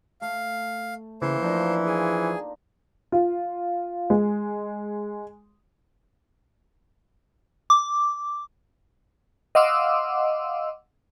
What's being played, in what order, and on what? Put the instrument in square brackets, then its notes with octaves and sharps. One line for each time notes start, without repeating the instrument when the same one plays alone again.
[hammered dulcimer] A3 [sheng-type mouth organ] F5
[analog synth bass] C#3 [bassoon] E3 [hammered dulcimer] A3 A#3 F4 [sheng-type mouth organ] C5
[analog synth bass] F3 [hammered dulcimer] D4 D#4 A#4
[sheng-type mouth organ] G#4
[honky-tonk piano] F4
G#3
[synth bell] D6
[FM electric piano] D#5 F5 F#5 C6 D6 E6